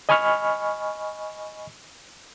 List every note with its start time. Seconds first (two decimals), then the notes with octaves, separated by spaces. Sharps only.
0.09 D#5 G#5 B5 C#6 F6